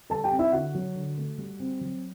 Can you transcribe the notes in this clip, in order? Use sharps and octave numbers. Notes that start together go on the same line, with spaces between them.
G3 A4 A5
G4 G5
C4
E4 E5
D3 F#4 F#5
F#3
D3
A3
G3
C4
F#3